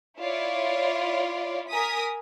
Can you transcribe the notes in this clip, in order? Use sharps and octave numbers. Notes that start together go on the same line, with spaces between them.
E4 F4 C#5 D5
A#4 G#5 D#6 B6